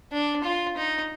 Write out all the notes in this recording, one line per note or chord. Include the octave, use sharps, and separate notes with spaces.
D4
F4
D#4